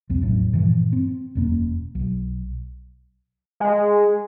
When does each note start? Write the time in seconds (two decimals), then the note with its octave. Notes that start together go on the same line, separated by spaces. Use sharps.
0.09 B1 F2 C4
0.21 E1 A1 A2 F#3
0.53 G2 A#2 E3 F3
0.93 C4
1.35 E1 F#2 A#3
1.95 B1
3.60 G#3